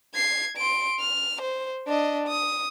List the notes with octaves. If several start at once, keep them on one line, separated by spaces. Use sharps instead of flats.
G#6 C7
C6 D7
F6
C5
D4 D#5
D#6